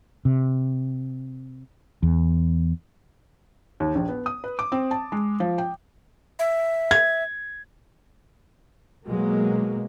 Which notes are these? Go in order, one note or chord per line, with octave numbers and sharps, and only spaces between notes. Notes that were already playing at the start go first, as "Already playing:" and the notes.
C3
E2
D#2
A#1
B3
D#6
B4
D6
C4
A5
G#3
F3
G5
E5
G#6
B2 F#3 G#3 A#3